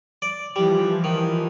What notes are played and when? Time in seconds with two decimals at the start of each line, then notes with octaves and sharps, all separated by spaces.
0.22 D5
0.56 E3 F3 G3
1.04 D#3